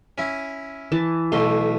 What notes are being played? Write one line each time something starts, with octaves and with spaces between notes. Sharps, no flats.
C#4 E4
E3 A5
B1 B2 A3 C6